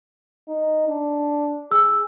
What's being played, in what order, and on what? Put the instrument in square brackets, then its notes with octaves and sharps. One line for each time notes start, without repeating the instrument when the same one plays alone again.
[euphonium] D#4
D4
[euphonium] G#4 [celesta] E6